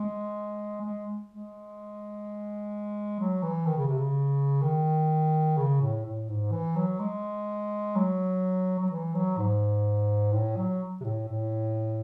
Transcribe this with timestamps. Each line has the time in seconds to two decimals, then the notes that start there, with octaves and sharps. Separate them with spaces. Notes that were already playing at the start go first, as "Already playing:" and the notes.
Already playing: G#3
0.81 G#3
1.29 G#3
3.20 F#3
3.43 E3
3.66 D#3
3.77 C#3
3.87 C3
3.97 C#3
4.62 D#3
5.57 C#3
5.81 A2
6.05 A2
6.29 G#2
6.52 E3
6.76 F#3
6.99 G#3
7.95 F#3
8.79 F#3
8.91 E3
9.14 F#3
9.38 G#2
10.33 A2
10.57 F#3
11.00 C3
11.04 A2
11.27 A2